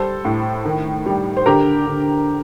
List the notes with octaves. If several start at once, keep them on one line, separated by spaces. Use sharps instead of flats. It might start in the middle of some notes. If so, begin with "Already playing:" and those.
Already playing: G3 A4 C5
A2
D#3
G3
C5
D3 G4 A#4
D3